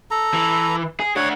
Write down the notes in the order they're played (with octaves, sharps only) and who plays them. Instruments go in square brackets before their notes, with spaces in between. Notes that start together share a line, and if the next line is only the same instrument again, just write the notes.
[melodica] A4 A#5
[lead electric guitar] E3
G#4
[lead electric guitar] D4 F#4 [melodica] C#5 F#5